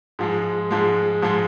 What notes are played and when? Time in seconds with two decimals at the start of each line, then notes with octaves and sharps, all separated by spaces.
0.19 G#2 F3 G#3
0.71 G#2 F3 G#3
1.22 G#2 F3 G#3